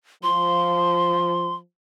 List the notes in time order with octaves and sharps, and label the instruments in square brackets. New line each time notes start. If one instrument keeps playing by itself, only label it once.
[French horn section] F3 [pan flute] C6